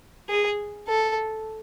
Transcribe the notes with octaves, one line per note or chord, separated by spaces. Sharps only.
G#4
A4